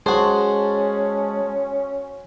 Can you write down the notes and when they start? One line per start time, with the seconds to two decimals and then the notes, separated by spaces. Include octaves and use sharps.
0.06 G#3 C#4 F#4 G#4 C5 A5